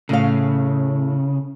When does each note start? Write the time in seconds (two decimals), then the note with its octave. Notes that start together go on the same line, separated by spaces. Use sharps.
0.09 A2 C#3 F5